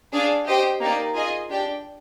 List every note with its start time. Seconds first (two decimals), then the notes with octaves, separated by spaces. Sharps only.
0.12 D4 G#4 D5 F5
0.46 G4 C5 D#5 G5
0.81 A#3 D#4 G4 A#4 D5
1.15 F4 G#4 D#5 G#5
1.49 D4 G4 D5 G5